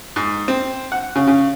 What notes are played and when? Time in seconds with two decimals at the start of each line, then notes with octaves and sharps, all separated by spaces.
0.16 G#2
0.48 C4
0.92 F#5
1.15 C#3
1.27 C#3